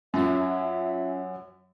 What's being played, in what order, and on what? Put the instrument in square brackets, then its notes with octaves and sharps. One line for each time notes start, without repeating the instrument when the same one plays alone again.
[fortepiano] F#2 [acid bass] F#3 [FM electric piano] C#4 F4 G#5 [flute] E5